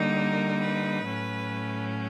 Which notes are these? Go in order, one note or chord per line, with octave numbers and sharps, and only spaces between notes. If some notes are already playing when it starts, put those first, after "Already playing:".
Already playing: D3 G3 A#3 D#4
A#4
B4
A2 F#3 A3 C#4